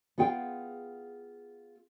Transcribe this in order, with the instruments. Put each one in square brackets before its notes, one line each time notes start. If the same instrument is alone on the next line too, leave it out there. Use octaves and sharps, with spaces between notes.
[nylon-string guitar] B3 F4 G#4 G5